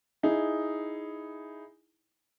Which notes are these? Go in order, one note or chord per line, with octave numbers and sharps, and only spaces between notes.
D#4 E4 G#4